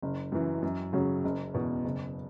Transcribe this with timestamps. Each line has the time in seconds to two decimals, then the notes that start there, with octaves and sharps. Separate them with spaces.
0.02 F#1
0.32 F#2 E3
0.62 F#2
0.93 C#3 F#3 C#4 F#4
1.24 F#1
1.54 E2 B2
1.85 F#1